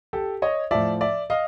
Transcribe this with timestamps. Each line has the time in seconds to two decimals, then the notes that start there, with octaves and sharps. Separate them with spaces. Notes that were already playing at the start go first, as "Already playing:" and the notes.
0.13 G4 A4
0.42 C#5 D#5
0.71 A2 F3 D5 E5
1.01 D5 E5
1.30 D#5 F5